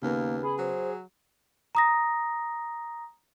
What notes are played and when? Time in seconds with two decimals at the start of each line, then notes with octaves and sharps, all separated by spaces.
0.02 D#2 C#3 A#3 B3
0.43 G#4 B5
0.58 F#3 C5
1.75 A#5 D#6 A#6